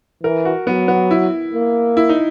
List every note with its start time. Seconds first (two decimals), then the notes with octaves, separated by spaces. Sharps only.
0.23 E3 A#4
0.45 F#4
0.67 F#3 B3
0.88 B3
1.11 E4
1.54 A#3
1.97 E4
2.09 D#4